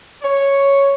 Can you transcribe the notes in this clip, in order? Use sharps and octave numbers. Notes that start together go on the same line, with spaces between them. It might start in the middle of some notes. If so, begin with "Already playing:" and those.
C#5